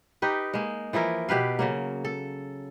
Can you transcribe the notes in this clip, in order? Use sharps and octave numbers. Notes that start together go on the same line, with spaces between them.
D#4 G4 B4
G#3 A#3
E3 F3 E4 A#4
B2 G4 B4 F5
C#3 F#3 A#3
A4